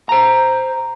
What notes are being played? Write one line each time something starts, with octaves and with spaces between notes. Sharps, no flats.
C5 A#5